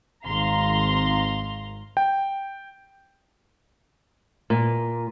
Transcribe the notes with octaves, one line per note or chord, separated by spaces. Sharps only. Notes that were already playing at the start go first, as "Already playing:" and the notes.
G#1 F5 A#5 C6
G5
A#2